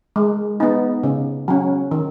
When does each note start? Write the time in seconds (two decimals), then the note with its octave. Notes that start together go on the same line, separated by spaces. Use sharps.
0.16 G#3
0.60 B3 D#4
1.03 C#3
1.48 F#3 C#4
1.91 D#3